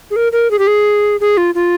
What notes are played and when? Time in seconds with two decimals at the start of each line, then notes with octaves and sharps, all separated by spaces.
0.11 G#4
0.16 A#4
0.32 A#4
0.51 G#4
0.59 G4
0.67 G#4
1.20 G#4
1.37 F4
1.55 F4